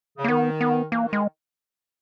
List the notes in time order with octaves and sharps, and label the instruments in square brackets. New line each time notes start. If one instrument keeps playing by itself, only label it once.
[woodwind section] C#3
[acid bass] A#3
[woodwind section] D#3 [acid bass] B3
[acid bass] B3
[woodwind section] E3 [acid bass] A#3
[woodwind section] D#3
[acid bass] G#3